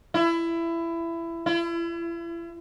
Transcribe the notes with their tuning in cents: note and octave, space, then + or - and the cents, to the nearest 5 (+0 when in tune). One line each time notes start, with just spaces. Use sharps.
E4 +20
E4 +40